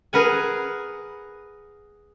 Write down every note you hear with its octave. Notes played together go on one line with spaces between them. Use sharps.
G#4 A#4 B4 F#5 G#5